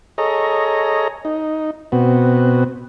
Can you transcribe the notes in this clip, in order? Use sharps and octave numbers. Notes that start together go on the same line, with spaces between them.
G#4 A4 C#5 D#5 A#5
D#4
B2 B3 C4 F#4